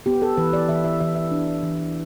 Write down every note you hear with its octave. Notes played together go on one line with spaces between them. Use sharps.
B3 G4
A4
E3 B4
D5
E3 E5
E5
E3 E5
E5
D4
E3